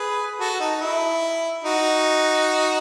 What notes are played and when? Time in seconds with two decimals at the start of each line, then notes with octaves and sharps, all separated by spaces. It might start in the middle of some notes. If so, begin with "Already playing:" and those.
Already playing: G#4 B4
0.39 F#4 A4
0.60 D#4
0.81 E4
1.64 D#4 F#4